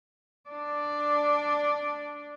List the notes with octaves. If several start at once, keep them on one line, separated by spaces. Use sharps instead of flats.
D4 D5